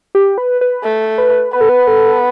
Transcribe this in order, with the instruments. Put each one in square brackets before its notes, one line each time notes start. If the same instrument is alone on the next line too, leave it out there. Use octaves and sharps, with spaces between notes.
[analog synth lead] G4
B4
B4
[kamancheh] A3
[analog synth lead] B4
[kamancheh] B3 [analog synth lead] B4
[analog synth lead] A4
B4
A4